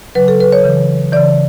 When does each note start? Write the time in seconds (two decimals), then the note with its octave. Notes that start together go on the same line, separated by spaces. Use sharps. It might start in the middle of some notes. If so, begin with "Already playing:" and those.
0.15 C#3 F#3 B4
0.28 A4
0.40 B4
0.52 C#5
0.64 C#3 E3
1.12 C#3 E3 D5